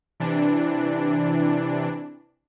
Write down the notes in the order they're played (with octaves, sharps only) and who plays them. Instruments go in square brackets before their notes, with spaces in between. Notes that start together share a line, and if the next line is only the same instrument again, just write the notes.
[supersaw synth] C3 E3 D4